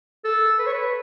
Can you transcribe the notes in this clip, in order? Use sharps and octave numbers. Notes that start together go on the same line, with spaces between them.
A4
B4
C#5
B4